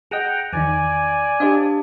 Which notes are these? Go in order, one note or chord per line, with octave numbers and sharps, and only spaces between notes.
G#4 D#5 F#5 G5 A#5
E2 D#3 D#4 D5 G#5
D4 G4 C5 D#5 F5